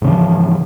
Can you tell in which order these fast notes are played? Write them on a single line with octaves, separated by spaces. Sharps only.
G#2 C#3 E3 F3